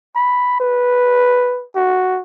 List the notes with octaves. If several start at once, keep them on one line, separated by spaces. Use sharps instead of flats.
B5
B4
F#4